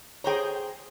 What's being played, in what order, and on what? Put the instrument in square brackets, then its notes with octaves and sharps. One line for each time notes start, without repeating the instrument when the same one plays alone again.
[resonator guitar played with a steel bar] G#4 C5 A#5 [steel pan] C#5 G5